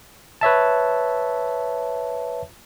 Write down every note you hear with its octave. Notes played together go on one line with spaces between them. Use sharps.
B4 C#5 E5 A5